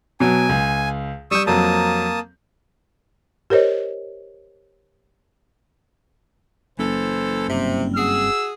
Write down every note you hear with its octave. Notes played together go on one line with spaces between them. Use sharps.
B2 F#3 G#5
C#2
G3 C#6 D#6 E6 G6
F2 F#3 A#3 C4 A5 D#6
G4 A#4 C5 C#5 D#5
F#1 E3 A4 C5
G2 C3 G3 C4
F#4 G#4 E6